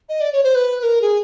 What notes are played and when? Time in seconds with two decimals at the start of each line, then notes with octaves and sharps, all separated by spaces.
0.09 D#5
0.21 D5
0.33 C#5
0.44 C5
0.55 B4
0.79 B4
0.83 A#4
1.02 G#4